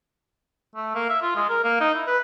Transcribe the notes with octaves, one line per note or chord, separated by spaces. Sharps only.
A3
A#3
E5
F4
G#3
A#4
A#3
D#4
E4
B4